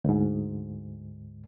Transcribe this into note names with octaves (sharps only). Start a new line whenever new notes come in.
D2 G#2